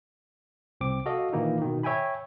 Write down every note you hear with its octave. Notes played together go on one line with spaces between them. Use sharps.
C2 C4 D6
F#4 A4 D#5 F5
A#2 D#3 E3 A#3 D#4 E4
B2 D#3
C#5 E5 G5 G#5 B5